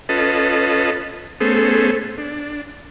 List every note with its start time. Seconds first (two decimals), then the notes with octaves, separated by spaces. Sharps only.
0.09 C#4 F4 A4 B4 D#5 A5
1.40 A3 B3 C#4 G#4 A4 C5
2.18 D4